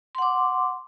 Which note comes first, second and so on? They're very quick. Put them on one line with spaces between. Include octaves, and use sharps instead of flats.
C6 F#5 D6